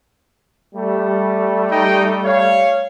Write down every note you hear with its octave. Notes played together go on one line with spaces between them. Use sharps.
G3 A3
D#4 D#5 G5
C#5 F5